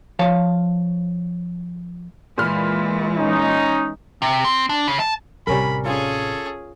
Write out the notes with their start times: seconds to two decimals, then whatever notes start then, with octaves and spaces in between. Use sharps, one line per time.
0.19 F3 C#5 F5 A5
2.38 A#2 E3 G#3 B5 F6
3.17 C#4 D#4
4.22 C3
4.44 C4
4.69 D4
4.88 C#3
5.00 A5
5.47 A1 C3 G3 C#4 A#4 B5
5.85 C#4 F4 G#4 A4